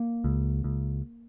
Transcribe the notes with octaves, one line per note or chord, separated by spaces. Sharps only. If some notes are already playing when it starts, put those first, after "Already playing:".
Already playing: A#3
C#2
C#2